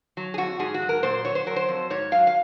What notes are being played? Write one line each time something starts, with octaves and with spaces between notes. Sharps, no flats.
F#3
G#4
F2 F#4
G#2 G#4
F#4
F#3
A#4
A#2 C5
F#3 C#5
C5
F#3 A#4
C5
F2
G#2 C#5
F#3 F5
F5